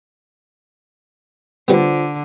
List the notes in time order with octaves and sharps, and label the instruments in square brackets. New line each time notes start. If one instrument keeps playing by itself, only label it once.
[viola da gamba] D3 [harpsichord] G3 B3 [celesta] F4 C5